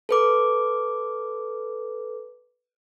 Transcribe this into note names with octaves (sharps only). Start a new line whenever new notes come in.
A4 B4 D6